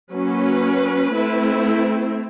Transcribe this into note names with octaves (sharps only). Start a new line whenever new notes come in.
F#3 A#3 C#4 B4
A3 C4 E4